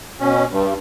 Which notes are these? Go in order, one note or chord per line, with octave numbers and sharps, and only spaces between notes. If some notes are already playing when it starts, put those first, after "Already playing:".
B2 C#4
G2